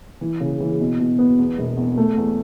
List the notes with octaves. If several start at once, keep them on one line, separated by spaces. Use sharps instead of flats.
E3
C#3
E3
B2
B2
B3
E2
E1
E2
A3
E2